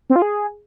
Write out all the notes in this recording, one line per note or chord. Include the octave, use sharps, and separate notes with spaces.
C4
F4
G#4